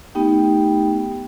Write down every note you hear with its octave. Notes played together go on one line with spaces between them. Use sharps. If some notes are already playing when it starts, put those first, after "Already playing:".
A3 B3 D#4 G4 G5